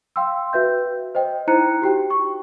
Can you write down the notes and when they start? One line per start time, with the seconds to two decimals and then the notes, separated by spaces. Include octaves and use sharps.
0.16 F5 G5 C6 E6
0.53 F#4 B4 E5 G6
1.15 C5 D#5 G5
1.47 D#4 E4 C5 A#5 F#6 C#7
1.82 F#4 G4 G5
2.10 C#6